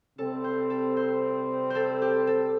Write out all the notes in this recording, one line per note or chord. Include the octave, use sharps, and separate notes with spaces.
C3 G3 C4 A4
C5
A4
C5
A4 C5
G4
A4